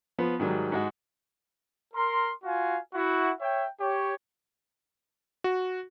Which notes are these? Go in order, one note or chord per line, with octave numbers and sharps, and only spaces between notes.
F3 B3
G#2 D#3 F#3 G3
G#2 G#3 F#4
A#4 C6
F4 F#4 F5 G#5
E4 F#4
C#5 E5 G5
G4 C#5
F#4